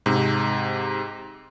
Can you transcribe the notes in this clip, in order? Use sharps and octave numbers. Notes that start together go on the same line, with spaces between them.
G#2 C3